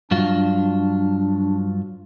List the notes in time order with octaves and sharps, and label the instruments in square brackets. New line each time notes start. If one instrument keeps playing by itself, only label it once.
[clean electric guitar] G2 F#3 F4 [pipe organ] D4